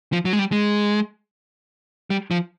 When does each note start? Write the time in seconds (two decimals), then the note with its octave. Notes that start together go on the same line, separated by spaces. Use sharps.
0.13 F3
0.25 F#3
0.33 G#3
0.39 G3
0.52 G#3
2.10 G3
2.31 F3